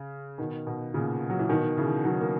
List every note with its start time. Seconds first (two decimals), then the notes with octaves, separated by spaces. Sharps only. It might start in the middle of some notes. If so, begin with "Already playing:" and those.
Already playing: C#3
0.38 B2 D#3
0.67 B2
0.94 A#2 C#3
1.30 F#3
1.39 E3
1.49 B2 D#3
1.77 C#3 E3
2.05 D#3 F#3
2.21 A#3